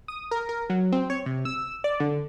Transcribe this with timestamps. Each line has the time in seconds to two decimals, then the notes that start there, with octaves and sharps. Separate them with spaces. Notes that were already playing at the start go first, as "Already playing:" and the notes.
0.08 D#6
0.31 A#4
0.49 A#4
0.70 F#3
0.92 C4
1.10 C#5
1.26 C3
1.45 E6
1.84 D5
2.00 D3